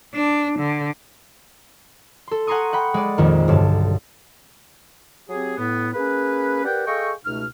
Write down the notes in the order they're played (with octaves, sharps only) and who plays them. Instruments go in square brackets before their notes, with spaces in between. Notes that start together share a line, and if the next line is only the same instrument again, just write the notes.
[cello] D4
D3
[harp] A4 C6
F#5 G#5 A#5 C6 C#6 D#6
F#5 G5 B5
G#3 D5
A#1 F2 D#3
B1 G2 D3 A5
[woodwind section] F#3 C4 G4 G#4
A2 B3
A#3 C#4 G#4 B4
G4 A#4 B4 D5 F#5 G5
G#4 A4 D#5 F5 G5 C#6
C#2 B2 A3 D#4 F6